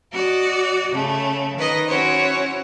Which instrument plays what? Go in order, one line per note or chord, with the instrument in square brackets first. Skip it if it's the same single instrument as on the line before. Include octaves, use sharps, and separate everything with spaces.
[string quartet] F#4 D5 D#5
C#3 A3
D#3 B4 D#5
C#4 E4 F#4 C5 C#5